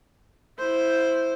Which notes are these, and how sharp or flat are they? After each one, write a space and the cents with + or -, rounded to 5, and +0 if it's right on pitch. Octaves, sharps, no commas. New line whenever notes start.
E4 +0 C5 +0